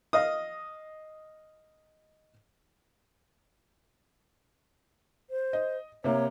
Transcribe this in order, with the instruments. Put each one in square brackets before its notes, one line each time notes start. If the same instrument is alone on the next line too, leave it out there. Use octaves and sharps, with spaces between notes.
[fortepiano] D#5 F5 D#6
[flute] C5
[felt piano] D#5
[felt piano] C3 A#3 [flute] C#5